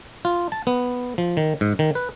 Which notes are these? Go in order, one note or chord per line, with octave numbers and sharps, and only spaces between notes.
F4
A5
B3
F3
D#3
G#2
D#3
B4